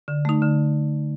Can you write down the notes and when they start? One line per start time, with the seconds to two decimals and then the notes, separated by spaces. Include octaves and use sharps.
0.08 D3
0.25 A3 D#4
0.42 D3